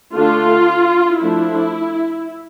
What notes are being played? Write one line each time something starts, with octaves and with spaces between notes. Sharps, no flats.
D3 A3 D4 F4
F3 A3 D4 E4